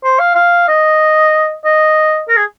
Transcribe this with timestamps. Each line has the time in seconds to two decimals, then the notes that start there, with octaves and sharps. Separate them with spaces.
0.04 C5
0.19 F5
0.35 F5
0.68 D#5
1.65 D#5
2.28 A#4
2.37 G#4